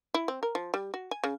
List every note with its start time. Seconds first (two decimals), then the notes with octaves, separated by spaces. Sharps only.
0.14 E4
0.28 C4
0.43 A#4
0.55 F3
0.74 G3
0.94 F#4
1.11 G#5
1.24 C#3